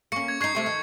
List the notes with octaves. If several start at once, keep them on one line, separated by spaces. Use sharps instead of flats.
A#3 C#4 C#6 C#7
G#6
D4 D#4 C#6 G#6 C7
C3 A3 C4
D#3